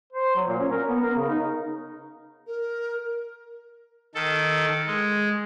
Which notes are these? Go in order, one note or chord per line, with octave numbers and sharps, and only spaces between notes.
C5
F#3
A#2
C#4
A#4
B3
A#4
C#3
D#4
A#4
D#3 A4
G#3